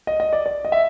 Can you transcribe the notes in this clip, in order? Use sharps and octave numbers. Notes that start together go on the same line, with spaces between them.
D#5
D#5
D5
D5
D#5
E5